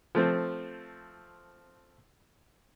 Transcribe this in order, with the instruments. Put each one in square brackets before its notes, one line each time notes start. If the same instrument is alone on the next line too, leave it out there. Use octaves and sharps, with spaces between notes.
[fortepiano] F3 A3 C4